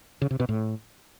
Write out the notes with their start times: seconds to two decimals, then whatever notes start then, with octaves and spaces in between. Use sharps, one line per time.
0.22 C#3
0.31 C3
0.40 B2
0.49 A2